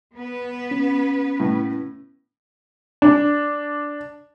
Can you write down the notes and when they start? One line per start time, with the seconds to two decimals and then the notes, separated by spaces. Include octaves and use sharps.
0.15 B3 B4
0.71 C#4
1.40 A2
3.02 D4